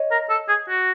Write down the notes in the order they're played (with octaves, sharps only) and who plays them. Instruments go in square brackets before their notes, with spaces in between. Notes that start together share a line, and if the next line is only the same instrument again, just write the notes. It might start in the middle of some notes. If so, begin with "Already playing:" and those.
Already playing: [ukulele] C#5 D#5
[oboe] A#4
A4
G#4
F#4